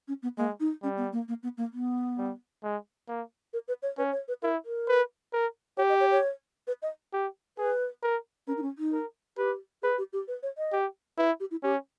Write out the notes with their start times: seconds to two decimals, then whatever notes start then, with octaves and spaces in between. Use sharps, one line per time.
0.08 C#4
0.23 B3
0.37 G#3 A#3
0.60 D#4
0.83 G3 C#4
0.97 B3
1.13 A#3
1.28 A#3
1.43 B3
1.57 A#3
1.73 B3
2.18 G3
2.63 G#3
3.08 A#3
3.53 A#4
3.68 B4
3.83 C#5
3.98 C#4 B4
4.12 C#5
4.28 B4
4.42 E4 A#4
4.65 A#4
4.88 B4
5.33 A#4
5.77 G4 C#5
5.89 D#5
6.00 C#5
6.11 C#5
6.67 B4
6.82 D#5
7.13 G4
7.58 G#4 B4
8.03 A#4
8.47 C#4 A#4
8.57 D#4
8.62 C#4
8.78 D#4
8.92 A#4
9.37 G4 B4
9.82 G#4 B4
9.98 G4
10.13 G4
10.28 B4
10.43 C#5
10.58 D#5
10.72 G4
11.18 E4 B4
11.40 G4
11.51 E4
11.63 C#4 G4